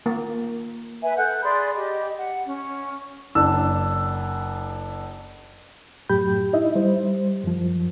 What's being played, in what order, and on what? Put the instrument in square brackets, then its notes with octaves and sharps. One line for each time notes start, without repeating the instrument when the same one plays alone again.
[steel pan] A#3
[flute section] B4 E5 G#5
A4 F#5 F#6 G6
G#4 D5 B5 C6
G4 D#5
F#5
C#4
[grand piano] F#1 D4 E6
[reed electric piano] F#2 A2 F#3 G4 B5 G6
D#4 E4 D#5 E5
G3 C5
F#2 F3